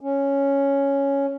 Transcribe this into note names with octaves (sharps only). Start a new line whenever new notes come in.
C#4